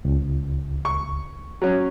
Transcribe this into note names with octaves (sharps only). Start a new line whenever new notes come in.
C#2
C#6
F#3 C#4